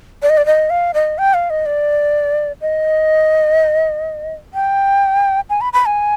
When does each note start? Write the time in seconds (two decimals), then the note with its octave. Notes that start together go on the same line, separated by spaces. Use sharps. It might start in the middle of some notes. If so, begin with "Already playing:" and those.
0.22 D5
0.30 D#5
0.37 D5
0.46 D#5
0.70 F5
0.94 D#5
1.18 G5
1.34 F5
1.50 D#5
1.66 D5
2.61 D#5
4.54 G5
5.50 G#5
5.61 B5
5.73 B5
5.86 G#5